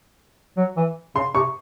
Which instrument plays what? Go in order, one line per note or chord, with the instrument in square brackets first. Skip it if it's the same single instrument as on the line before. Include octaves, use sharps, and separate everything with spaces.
[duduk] F#3
E3
[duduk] C#3 [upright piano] C6
[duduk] C3 [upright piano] C#6